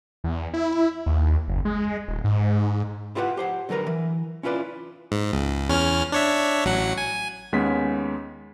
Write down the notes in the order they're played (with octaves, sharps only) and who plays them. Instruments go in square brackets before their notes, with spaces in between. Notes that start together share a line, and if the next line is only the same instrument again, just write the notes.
[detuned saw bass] E2
E4
D#2
F#1
G#3
D#1
G#2
[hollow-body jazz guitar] E4 F4 G4 B4 D#5 F#5
G4 C5 F#5
D3 F#3 G4 A#4 B4
E3
C#4 E4 F4 B4 D5
[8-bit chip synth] G#2
C#2
E2 C#4 F6
D4 C#5 E5
A1 F#3 F#5
G#5
[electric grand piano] D#2 G#3 B3 C#4 B6